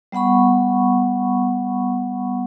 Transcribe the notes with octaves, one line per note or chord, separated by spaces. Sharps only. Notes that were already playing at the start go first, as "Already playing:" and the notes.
G3 B3 F#5 B5 C#6